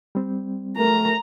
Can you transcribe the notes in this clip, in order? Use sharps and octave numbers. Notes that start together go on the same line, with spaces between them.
G3 C4
A3 A#4 A#5